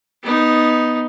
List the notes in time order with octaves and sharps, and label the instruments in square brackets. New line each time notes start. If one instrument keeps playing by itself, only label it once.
[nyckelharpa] B3 D#4